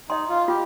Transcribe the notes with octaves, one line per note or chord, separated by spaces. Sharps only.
D#4 D#5 C6
F4
F4 G4